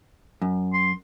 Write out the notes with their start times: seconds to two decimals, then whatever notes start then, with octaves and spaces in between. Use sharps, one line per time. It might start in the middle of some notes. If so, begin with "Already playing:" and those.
0.42 F#2
0.74 C6